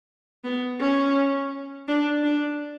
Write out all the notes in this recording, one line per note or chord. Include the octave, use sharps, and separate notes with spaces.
B3
C#4
D4
D4